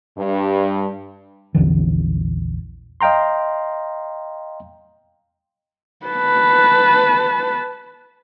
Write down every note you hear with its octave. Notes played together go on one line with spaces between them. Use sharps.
G2
A#1 E2 D3 E3
D#5 F5 G5 A#5 C6
B4 A5